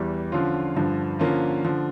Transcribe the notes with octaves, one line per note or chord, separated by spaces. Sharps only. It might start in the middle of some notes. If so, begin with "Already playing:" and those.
Already playing: E2 E3 G3
D3 F3 C#4 F4
G2 D3 F3
D3 F3 A#3 C#4 F4
D3 F3